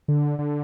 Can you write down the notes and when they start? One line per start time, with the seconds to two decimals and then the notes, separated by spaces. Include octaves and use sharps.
0.08 D3
0.39 D3